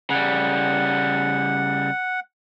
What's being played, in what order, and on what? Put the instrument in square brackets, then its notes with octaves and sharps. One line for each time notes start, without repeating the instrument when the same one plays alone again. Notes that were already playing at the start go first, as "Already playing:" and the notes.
[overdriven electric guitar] C#3 G3 [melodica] F#5